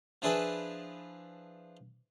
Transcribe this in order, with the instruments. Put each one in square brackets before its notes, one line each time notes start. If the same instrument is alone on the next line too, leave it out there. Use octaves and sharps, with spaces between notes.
[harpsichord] F3 D4 E4 G#4 B4 A5